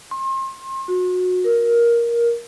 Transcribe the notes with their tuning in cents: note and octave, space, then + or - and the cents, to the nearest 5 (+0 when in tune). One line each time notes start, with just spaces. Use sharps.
C6 +35
F#4 -25
A#4 +10